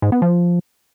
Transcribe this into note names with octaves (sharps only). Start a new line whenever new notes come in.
G#2
B3
F3